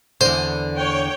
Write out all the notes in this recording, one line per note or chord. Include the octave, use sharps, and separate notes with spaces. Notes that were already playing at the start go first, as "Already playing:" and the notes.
E2 D3 C5
C#5 G5